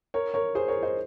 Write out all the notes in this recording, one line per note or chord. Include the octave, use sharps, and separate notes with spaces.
A#4 C#5
A#4 C#5
G#4 C5
A#4 C#5
C5 D#5